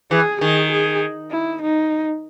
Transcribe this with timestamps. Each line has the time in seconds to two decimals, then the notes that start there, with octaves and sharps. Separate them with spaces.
0.11 E3 G#4
0.41 D#3 G#4
0.72 G#4
1.31 E4
1.62 D#4